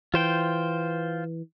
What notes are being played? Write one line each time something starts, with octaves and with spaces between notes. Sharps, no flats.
E3 F4 C5 G5